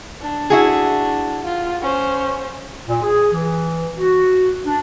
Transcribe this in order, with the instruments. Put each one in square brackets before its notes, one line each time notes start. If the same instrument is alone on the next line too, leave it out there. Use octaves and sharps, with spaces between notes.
[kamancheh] D4
[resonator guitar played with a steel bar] E4 F#4 G#4
[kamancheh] F4
C#4 C5
[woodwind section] A#2
G#4
E3
F#4
D4